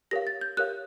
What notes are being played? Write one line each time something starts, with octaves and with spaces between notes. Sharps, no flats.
G4 A#4 C#5 F5 A#6
A6
G6
G4 A#4 C#5 F5 F#6